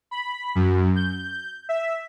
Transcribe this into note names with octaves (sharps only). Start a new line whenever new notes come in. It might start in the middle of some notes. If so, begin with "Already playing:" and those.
B5
F#2
G6
E5